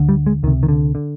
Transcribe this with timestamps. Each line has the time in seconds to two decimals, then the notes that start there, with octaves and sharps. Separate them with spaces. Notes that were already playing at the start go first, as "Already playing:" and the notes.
Already playing: D2 D3
0.09 G3
0.26 G#3
0.43 C#2 D#3
0.47 C3
0.63 D#3
0.68 D3
0.95 D3